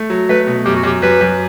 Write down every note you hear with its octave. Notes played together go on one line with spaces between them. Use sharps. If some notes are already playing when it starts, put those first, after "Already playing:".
Already playing: A3
F#3
A3 B4
B2
F#2 G4
F#4
F#2 G4
F#2 B4
F#2